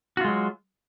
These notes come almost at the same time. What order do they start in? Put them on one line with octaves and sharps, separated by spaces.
F#4 F4 G#3 F#3